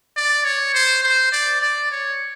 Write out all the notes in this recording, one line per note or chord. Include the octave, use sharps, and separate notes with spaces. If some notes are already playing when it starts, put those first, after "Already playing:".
D5
C#5
C5
C5
D5
D5
C#5